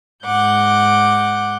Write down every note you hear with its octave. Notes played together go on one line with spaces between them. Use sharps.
G#2 F#5 D6 G6